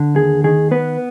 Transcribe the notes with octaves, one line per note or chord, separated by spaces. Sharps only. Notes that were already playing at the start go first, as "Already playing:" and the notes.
Already playing: D3
D#2 G#4
D#3 G#4
B3 B4